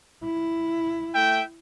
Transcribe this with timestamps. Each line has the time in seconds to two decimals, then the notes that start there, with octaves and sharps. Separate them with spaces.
0.24 E4
1.14 A3 E5 G5